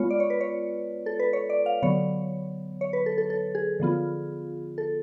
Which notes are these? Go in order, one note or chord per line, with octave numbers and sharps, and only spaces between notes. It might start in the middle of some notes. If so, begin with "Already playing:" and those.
Already playing: G#3 B3 F4 C#5
D5
C#5
B4
C#5
A4
B4
C#5
D5
F5
D3 F#3 B3 C#5
C#5
B4
A4
A4
A4
G#4
D3 F3 B3 F4
A4